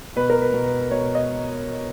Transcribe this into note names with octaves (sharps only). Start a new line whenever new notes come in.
B2 B4
A#4
B4
B2
B4
B2 C#5
D#5